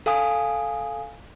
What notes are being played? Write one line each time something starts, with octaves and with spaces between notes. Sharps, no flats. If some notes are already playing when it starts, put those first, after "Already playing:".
A4 F5 G#5 D#6